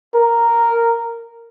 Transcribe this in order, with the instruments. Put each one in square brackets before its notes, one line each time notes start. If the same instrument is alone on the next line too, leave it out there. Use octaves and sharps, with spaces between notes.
[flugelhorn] A#4